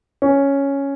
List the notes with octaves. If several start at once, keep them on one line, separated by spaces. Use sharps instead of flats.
C#4